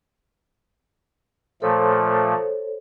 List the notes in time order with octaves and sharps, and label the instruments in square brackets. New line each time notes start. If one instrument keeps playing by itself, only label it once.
[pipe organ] A#2 F3 A3 [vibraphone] A4 C5 C#5